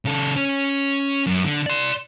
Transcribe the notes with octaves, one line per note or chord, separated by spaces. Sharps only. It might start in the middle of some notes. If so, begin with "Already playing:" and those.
C#3 A4
C#4
F#2
D3
D5 C6